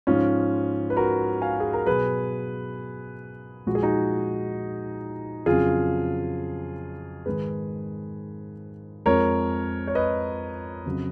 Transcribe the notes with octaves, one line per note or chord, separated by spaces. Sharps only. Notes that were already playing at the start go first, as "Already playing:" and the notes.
G#2 F3 G#3 C#4 F4
B4
F#4 A#4
F5 G#5
G#4
A#4
B2 F#3 G#4 B4
A#2 F3 G#3 F#4
G#4
D#4 F#4
F2 C#3 F#3 F4 G#4
G#2 D#3 G#3 G#4 B4
F2 F3 G#3 A#4 C#5
C#5
B4 D#5
F2 C#3 F#3